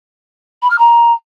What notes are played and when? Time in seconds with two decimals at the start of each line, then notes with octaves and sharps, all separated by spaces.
0.62 B5
0.70 F6
0.79 A#5